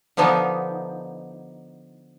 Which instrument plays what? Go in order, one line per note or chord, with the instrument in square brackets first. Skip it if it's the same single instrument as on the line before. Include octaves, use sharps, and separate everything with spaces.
[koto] D3 F3 B3 D4 D#4